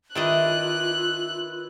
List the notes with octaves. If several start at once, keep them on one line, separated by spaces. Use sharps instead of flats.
D#3 D4 E4 F4 B4 D#5 F#6